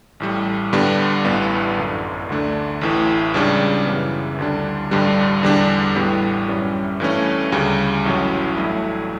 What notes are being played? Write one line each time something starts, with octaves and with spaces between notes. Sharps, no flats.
A1 A2 G3
G2 D3 G3 B3 D4
A1 G2 E3 B3
G1 F#2 D3
D2 D3 A3 D4
A1 A2 E3
C#2 C#3 G3 D4
F#2 C#3 E3 B3
D2 D3 G3 D4
A1 G2 D3 G3 D4
E2 D3 G3 D4
A1 A2 G3 B3
F#2 E3 G3 C#4
G2 E3 A3 C#4
D2 C#3 G3
A1 A2 F#3 C#4
A1 G2 F#3 A3 E4